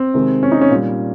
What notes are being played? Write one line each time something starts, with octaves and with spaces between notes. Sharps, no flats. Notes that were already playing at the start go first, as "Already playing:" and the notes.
Already playing: C4
C3 D#3 G#3
C#4
D#4
C#4
A#2 G3